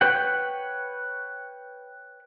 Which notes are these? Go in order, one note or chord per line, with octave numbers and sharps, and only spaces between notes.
B4 C#5 F#5 G5